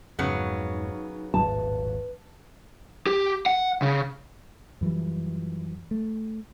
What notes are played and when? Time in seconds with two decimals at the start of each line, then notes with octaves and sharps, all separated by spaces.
0.19 F2 G#2 C#3 F#3 B3 D#4
1.34 D#1 G#1 A2 B4 A5
3.06 G4
3.46 F#5
3.82 C#3
4.81 F#2 E3 F3 G3
5.91 A3